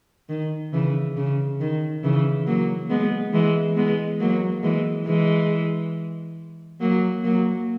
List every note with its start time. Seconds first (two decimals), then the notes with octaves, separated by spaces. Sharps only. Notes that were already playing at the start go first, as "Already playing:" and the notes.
0.29 D#3
0.73 C#3 E3
1.17 C#3
1.60 D#3
2.04 C#3 E3
2.47 F#3 A#3
2.90 G#3 B3
3.33 E3 G#3
3.76 G#3 B3
4.20 F#3 A#3
4.63 E3 G#3
5.07 E3 G#3
6.81 F#3 A#3
7.24 F#3 A#3